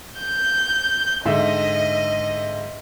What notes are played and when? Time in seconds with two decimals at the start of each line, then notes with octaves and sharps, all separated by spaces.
0.19 G6
1.25 G#2 D3 D#5 E5